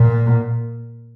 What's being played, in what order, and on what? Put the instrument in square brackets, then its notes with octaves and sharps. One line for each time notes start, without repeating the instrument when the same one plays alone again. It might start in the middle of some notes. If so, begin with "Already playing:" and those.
Already playing: [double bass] A#2